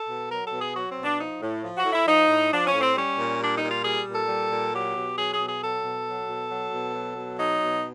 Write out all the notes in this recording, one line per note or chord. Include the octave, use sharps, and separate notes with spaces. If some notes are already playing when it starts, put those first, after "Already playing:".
Already playing: A4
B2
F#3 A#4
A4
B2
G#4
F#3 F#4
C4
B2
D4
F3 D#4
A2
F3
F#4
A2
E4
F3 D#4
A2
F3 D4
C#4
A2
C4
G3 C#4
A#2
G3 D4
D#4
A#2
F4
G3 G#4
A#2
A4
G3
A#2
F#3 G4
B2
F#3 G#4
G#4
B2
G#4
F#3 A4
B2
F#3
B2
F#3
B2
F#3
B2
F#3 D#4
B2